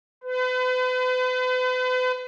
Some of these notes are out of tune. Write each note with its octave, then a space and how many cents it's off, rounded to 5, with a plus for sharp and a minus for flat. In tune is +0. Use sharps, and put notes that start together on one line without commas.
B4 +40